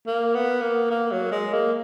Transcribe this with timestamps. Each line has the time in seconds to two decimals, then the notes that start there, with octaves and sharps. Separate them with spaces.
0.07 A#3
0.35 B3
0.62 A#3
0.90 A#3
1.11 F#3
1.32 G#3
1.53 A#3